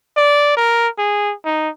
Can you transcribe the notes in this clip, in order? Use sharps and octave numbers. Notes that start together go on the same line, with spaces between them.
D5
A#4
G#4
D#4